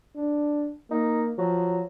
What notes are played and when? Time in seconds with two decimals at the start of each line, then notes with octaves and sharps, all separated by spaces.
0.16 D4
0.91 A#3 D#4
1.38 F3 F#3